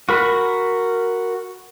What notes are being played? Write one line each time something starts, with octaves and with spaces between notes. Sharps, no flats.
F#4 A#4 B5